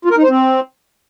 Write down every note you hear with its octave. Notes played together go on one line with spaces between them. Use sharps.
F4
A#4
D#4
C5
C4